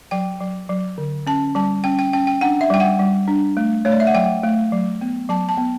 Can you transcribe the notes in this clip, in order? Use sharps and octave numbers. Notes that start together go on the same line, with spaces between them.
F#3 G5
F#3
F#3
D3
C#4 A5
G3 A5
C#4 G5
G5
C#4 G5
G5
D4 F#5
E5
G3 G5
F#5
G3
D4
A3
A3 C#5
D5
E5
F#5
F#3 G5
A3
F#3
B3
F#3 A5
A5
B3